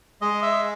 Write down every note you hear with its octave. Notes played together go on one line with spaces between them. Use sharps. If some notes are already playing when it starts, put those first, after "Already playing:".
G#3 D#5
E5